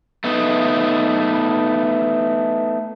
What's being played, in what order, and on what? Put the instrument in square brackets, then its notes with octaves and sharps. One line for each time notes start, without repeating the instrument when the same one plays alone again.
[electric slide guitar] A3 B3 D#4